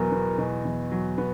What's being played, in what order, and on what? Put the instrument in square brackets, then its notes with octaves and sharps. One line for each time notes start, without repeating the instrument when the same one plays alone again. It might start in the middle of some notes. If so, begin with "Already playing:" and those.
Already playing: [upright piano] E2 B2 F#3 B3 [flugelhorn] A#4
[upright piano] B3
B2
E2
F#3
B3